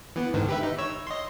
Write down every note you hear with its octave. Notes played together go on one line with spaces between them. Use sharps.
E3 B3
G#2 D3 D#3
G4 B4 E5
D#4
C#5 E6
D#5 C6